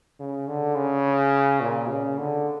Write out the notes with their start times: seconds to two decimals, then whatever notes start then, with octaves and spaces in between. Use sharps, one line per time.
0.20 C#3
0.48 D3
0.76 C#3
1.61 A#2
1.89 C#3
2.18 D3